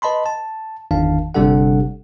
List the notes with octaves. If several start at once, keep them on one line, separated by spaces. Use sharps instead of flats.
B4 D#5 A5 B5 C6
A5
G1 E2 D#3 D4 F5 A5
G1 C3 G3 D4 A4 F#5